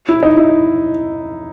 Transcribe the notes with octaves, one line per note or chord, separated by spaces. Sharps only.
E4
D#4
E4